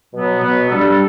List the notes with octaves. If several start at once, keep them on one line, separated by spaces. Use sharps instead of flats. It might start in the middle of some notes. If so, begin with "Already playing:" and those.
B2 F#3 B3
B2 F#3 B3
G3 D4 A4